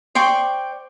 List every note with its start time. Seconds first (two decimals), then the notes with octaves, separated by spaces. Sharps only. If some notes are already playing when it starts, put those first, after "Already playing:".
0.15 C5 D5 G5 C#6